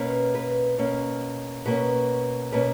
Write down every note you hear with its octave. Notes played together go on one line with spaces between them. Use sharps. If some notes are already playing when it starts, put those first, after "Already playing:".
Already playing: B2 A#3 C#4 B4
B4
B2 A#3 C#4
B2 A#3 C#4 B4
B2 A#3 C#4 B4